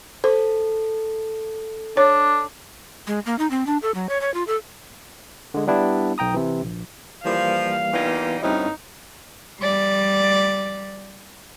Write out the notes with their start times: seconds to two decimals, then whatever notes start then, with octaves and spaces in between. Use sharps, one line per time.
0.24 A4 C5
1.97 D4 C#5
3.07 G#3
3.26 A#3
3.39 D#4
3.50 C4
3.67 D4
3.82 A4
3.94 F#3
4.09 C#5
4.21 C#5
4.34 F4
4.47 A4
5.54 D3 G#3
5.67 G3 B3 D4 E4 G4
6.18 B1 G5 A#5 D#6
6.34 C3 E3
6.62 A#1
7.25 E3 F3 G3 A#3 F5
7.93 A#2 E3 G3 B3 D#4 G#6
8.43 D2 G2 B2 C4 C#4 D#4 E4
9.60 G3 D5